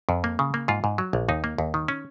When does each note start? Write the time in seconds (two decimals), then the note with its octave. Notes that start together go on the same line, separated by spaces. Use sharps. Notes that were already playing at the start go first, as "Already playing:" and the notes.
0.09 F2
0.24 A#3
0.39 C#3
0.54 A#3
0.68 G#2 F4
0.84 G#2
0.98 F#3
1.13 A#1
1.29 D#2 D#4
1.44 A#3
1.58 D#2
1.74 D#3
1.88 C#4